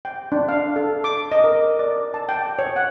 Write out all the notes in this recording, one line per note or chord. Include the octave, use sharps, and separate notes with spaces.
G5
D4
F5
A4
D6
D#5
A#4
D5
A5
G5
C#5
F#5